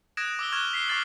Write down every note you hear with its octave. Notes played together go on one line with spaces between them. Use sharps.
D#6 F#6 G#6 A#6 D7 E7
D6 E6 G7
C#6 F6 F#6 G#6 E7 G7
B6 C7 G7
C#6 F6 F#6 A6 C7 F#7